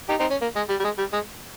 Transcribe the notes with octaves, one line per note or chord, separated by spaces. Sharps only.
D#4 G4
C4 D#4
C#4
A#3
G#3
G3
G3
G#3
G3
G#3